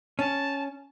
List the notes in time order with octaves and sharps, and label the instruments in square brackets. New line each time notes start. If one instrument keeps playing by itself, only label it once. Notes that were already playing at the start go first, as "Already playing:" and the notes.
[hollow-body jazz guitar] C#4 [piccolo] A5